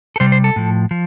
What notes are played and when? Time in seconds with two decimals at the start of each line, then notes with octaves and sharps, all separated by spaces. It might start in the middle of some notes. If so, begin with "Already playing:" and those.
0.16 A4
0.20 C3 G3 C5
0.32 C5
0.44 A4
0.56 A2 F3
0.91 F3